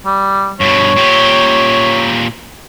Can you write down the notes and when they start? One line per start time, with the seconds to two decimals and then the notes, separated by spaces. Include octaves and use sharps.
0.06 G3
0.60 G2 B2 C#5
0.96 A#2 G4